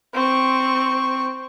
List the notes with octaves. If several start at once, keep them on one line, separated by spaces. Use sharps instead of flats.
C4 C#6